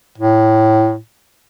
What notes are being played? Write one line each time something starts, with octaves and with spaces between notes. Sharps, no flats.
A2